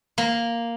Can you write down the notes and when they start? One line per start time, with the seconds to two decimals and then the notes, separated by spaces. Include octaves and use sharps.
0.18 A#3